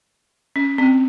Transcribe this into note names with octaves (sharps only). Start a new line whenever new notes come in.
C#4
C4